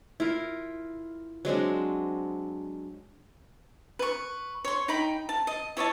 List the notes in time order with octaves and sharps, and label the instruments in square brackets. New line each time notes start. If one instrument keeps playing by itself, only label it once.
[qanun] E4 F4 A#4
F#3 G#3 C4 D4
[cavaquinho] B4 C#6
C#5 C6
D#4 G5 B5
A5
D#5
E4 C#5 D#5 A5